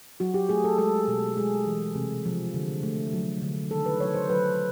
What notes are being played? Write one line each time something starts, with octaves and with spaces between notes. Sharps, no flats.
F#3 F#4
G4
A3 G#4
A4
G#3 A4
B2
G#3 G#4
E3
C3
F3
D3
A3
F#3
D3
D#3 A4
B4
F#3 C#5
C5
F#3 B4